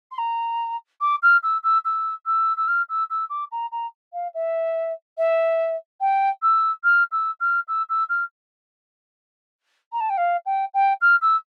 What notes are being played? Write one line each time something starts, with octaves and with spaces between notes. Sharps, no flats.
C6
A#5
D6
F6
E6
E6
E6
E6
E6
F6
E6
E6
D6
A#5
A#5
F5
E5
E5
G5
E6
F6
E6
F6
E6
E6
F6
A#5
A5
G5
F5
G5
G5
F6
E6